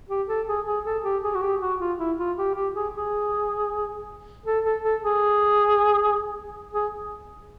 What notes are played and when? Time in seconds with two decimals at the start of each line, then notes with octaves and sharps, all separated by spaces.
0.09 G4
0.28 A4
0.47 G#4
0.66 G#4
0.85 A4
1.04 G4
1.24 G#4
1.35 F#4
1.42 G4
1.61 F#4
1.80 F4
1.99 E4
2.18 F4
2.38 G4
2.55 G4
2.75 G#4
2.94 G#4
4.46 A4
4.65 A4
4.83 A4
5.03 G#4
6.74 G#4